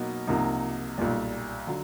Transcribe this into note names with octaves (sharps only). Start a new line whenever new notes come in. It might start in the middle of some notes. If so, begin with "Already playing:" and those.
Already playing: B2 F#3 A#3 D#4
C2 C3 F3 A#3 D#4
B1 A#2 G3
D3 F#3